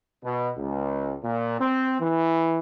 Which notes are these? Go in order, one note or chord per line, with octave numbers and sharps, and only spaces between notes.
B2
C#2
A#2
C4
E3